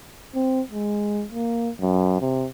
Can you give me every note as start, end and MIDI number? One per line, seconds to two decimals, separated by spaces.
0.35 0.61 60
0.71 1.24 56
1.32 1.70 58
1.81 2.18 42
2.21 2.48 48